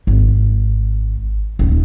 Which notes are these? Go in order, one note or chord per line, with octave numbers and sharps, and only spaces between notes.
G#1
D#1 D#3